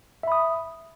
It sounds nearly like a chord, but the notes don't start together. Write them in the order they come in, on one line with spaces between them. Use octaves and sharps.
E5 B5 D#6